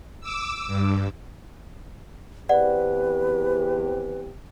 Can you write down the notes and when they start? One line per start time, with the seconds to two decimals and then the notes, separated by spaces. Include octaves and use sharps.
0.21 D6 E6
0.67 G2
2.49 E2 C4 G4 B4 D5 F#5